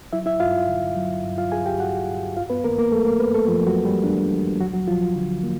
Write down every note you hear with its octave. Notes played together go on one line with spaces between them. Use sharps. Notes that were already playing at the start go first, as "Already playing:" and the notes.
F#3 E4 E5
E4 E5
G2 F4 F5
D3
F#3
G2
F4 F5
G2 G#4 G#5
G4 G5
G2 F#4 F#5
G2
F#2 F4 F5
B3 B4
D#3 A#3 A#4
A#3 A#4
F#3 A3 A4
A#3 A#4
F#2 B3 B4
A3 A4
F#2 F3 F4
F#3 F#4
F#3
G3 G4
D#3 D4
F#3
D2 F#3 F#4
F#3 F#4
F3 F#3 F4
D3
A#3